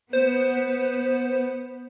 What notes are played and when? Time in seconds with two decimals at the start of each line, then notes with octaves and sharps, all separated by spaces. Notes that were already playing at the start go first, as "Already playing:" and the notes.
0.13 B3 C5